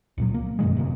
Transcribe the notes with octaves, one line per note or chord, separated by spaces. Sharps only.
C#2 A#2 F#3
A#3
F#2 B2 D#3 G#3
F1 C3 A#3